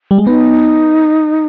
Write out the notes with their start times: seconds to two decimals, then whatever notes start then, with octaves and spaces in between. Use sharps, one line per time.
0.11 G3
0.18 G#3
0.26 B3 D#4